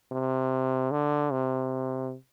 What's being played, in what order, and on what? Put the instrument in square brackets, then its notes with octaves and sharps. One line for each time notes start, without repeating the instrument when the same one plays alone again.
[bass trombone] C3
D3
C3